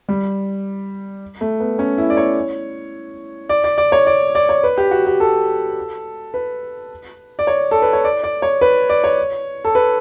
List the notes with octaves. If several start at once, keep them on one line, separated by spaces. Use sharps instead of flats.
G3
A3
B3
C#4
E4
D5
C#5
D5
D5
D5
C#5
D5
D5
C#5
B4
G4
F#4
G4
A4
B4
D5
C#5
A4
B4
C#5
D5
D5
C#5
B4
D5
C#5
A4
B4